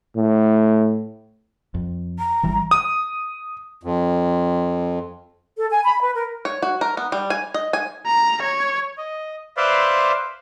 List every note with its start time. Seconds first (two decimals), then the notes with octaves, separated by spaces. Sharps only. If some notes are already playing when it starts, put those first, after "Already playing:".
0.16 A2
1.75 F2
2.19 A#5
2.43 G#1 E3 G3
2.71 D#6
3.83 F2
5.57 A4
5.69 G#5
5.84 B5
6.01 B4
6.14 A#4
6.45 C#5
6.62 F#4
6.81 A#4
6.97 B3
7.12 G3
7.30 G#5
7.54 D#5
7.73 G#5
8.07 A#5
8.43 C#5
8.98 D#5
9.57 B4 C5 D5 E5 F5 C6